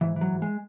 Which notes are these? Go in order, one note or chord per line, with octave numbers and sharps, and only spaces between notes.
G#2 E3
E3
F#3
G#2
G#3